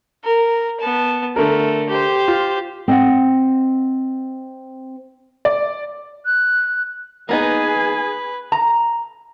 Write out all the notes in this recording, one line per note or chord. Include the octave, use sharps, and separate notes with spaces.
A#4
B3 A5
D3 A3 A#4
G4 C5
F4
C4 D#5 F#5
D5
F#6
A#3 B3 D#4 G#4 B4 G#5
A#5